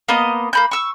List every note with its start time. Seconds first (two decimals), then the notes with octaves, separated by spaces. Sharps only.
0.08 A#3 B3 D#5
0.53 A#3 B5 G6
0.71 C#6 E6